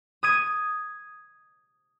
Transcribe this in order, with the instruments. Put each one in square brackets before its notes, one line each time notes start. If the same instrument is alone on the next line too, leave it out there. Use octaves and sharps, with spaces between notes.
[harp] D#6 G#6 D#7